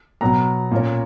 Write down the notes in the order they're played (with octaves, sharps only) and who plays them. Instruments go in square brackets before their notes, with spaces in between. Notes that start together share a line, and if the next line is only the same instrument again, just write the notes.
[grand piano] B2 F#3 B3 A#5
A#2 A#3 C#4